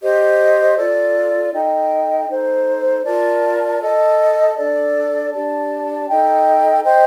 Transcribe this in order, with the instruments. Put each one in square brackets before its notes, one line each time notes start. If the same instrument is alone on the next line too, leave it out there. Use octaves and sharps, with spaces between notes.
[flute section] G4 C5 D#5
F4 A4 D5
D#4 A4 D#5 G5
D#4 A4 C5
F4 A#4 D5 A5
A4 D#5 A5
D4 A4 D5
D4 G4 D5 A5
D#4 A4 D#5 G5
C5 D#5 G5